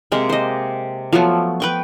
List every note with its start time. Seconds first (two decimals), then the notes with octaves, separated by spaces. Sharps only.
0.12 C3 G#3 A#3 G5
0.29 C5 D#5
1.13 F3 F#3 A3 B3
1.60 B4 G5 C#6